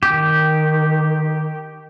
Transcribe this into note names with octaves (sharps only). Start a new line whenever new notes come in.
D#3 G4